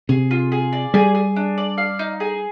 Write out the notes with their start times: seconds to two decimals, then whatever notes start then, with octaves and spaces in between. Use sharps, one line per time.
0.09 C3 G#4
0.31 F4
0.52 G#4
0.73 D5
0.94 G3 G#4
1.15 G#4
1.36 D4
1.58 D5
1.78 F5
1.99 D#4
2.20 G#4